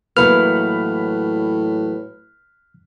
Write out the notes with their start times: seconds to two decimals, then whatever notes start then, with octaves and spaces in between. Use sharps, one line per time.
0.17 E2 A2 F#3 A#3 B4 B5 F6